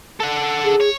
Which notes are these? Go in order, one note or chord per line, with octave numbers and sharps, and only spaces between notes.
A4 F#5
G#4
C#5